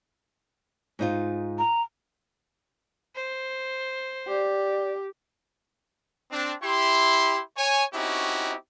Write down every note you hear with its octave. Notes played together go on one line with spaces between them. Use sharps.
G#2 D#4 F4
A#5
C5
G4 D5
C4 D4
E4 G4 C6
C#5 G#5
C4 C#4 D#4 E4 F#4 G4